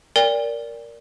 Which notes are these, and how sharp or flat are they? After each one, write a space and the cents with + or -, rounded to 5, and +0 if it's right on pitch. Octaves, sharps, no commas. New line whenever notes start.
A#4 +0 D5 -15 G5 +45